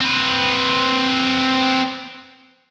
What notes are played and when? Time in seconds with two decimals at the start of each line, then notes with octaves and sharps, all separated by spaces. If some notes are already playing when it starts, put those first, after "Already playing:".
0.01 C4 B4